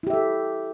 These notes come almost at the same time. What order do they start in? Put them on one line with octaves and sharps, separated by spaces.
E4 G4 E5 A4